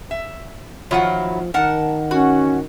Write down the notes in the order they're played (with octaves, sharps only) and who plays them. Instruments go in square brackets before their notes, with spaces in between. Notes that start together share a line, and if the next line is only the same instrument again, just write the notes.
[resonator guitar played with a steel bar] E5
[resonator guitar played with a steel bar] D#3 F4 F#5 [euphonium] F3 [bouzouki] F#3 E4
[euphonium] D#3 [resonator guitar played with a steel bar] A#4 F#5 [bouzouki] A5
[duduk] C#4 [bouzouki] F#4